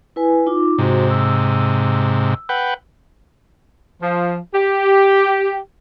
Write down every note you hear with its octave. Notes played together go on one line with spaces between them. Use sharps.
E4 B4 G#5
D#4 F4 D6
G#2 C3 F#4 C5
E6
B4 F#5 G5
F3
G4